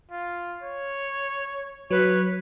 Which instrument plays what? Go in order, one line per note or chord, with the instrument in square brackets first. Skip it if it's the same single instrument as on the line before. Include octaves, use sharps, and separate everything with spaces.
[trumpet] F4
C#5
[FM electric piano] F#3 [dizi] B4 [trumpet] C#5